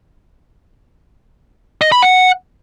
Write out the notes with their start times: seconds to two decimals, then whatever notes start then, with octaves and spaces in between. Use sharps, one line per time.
1.81 D#5
1.92 B5
2.02 F#5